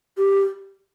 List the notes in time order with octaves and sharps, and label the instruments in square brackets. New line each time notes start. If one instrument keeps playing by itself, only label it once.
[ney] G4